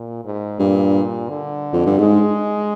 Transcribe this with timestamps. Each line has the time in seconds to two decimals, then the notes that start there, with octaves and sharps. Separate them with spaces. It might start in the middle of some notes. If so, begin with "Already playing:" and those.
Already playing: A#2
0.25 G#2
0.59 G2 A#2
1.29 D3
1.73 F2
1.86 G2
1.99 G#2 G#3